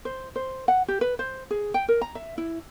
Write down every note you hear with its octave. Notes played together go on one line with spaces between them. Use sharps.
C5
C5
F#5
G4
B4
C5
G#4
G5
A#4
A#5
E5
E4